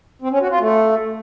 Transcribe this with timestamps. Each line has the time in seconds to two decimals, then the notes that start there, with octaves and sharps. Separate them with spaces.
0.22 C4
0.31 C#4
0.41 F#4
0.50 F4
0.60 A3